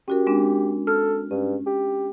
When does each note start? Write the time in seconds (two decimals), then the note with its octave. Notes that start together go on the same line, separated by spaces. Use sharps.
0.08 C#4 F#4 G4 A#4
0.27 G#3 C4 D4
0.87 A4 F6
1.31 G2 C#4
1.67 G4